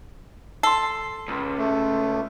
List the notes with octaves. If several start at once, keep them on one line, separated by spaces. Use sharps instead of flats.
A4 C6 C7
C#2
A3